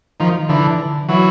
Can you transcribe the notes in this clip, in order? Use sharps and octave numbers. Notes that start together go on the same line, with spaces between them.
D#3 F3
D3 E3
E3 F#3